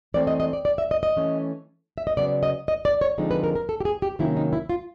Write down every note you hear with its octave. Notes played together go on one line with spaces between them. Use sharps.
E3 A3 C4 D5
D#5
D#5
D5
D5
E5
D#5
D#5
E3 A3 C#4
E5
D#5
C#3 F#3 B3 D5
D#5
D#5
D5
C#5
D3 F3 G#3 C4 D#4
B4
A#4
A#4
A4
G4
G#4
G4
C3 D#3 F#3 A#3 C#4 E4
D#4
E4
F4